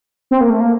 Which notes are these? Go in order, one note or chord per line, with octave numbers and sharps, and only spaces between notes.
C4
A#3
A3
A#3